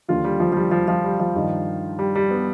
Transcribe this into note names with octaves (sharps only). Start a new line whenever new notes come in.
D#2 D3 F3 F4
G3
F3
F3
G3
F3
F3
G3
F3
G2 D#3
G3
G3
B3